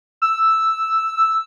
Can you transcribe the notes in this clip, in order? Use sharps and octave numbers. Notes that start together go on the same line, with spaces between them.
E6